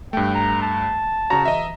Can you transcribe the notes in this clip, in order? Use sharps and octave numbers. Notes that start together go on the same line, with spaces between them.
G2 A3 G5
A#5
A5
C#3 F#4 A#5
E3 D#5 E5